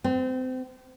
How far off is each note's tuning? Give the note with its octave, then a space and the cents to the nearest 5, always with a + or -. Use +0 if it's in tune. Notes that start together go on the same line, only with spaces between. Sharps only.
C4 -30